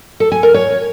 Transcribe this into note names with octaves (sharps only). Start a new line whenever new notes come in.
A4
G#5
A#4
C#5